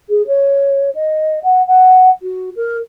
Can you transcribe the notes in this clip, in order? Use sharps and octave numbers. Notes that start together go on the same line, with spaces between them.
G#4
C#5
D#5
F#5
F#5
F#4
A#4